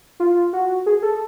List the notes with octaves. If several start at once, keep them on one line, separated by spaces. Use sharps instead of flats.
F4
F#4
G#4
A4